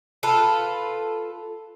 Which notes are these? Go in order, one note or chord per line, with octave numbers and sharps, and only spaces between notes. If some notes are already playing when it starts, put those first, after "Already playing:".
F4 A4 B4